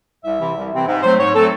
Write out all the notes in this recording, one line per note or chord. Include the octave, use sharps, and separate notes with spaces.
C2 E5
C3 E3 C4
C2
C3 E3 C4
G#2
F#3 A3 C4 C5
G#2 C#5
F#3 A3 C4 A4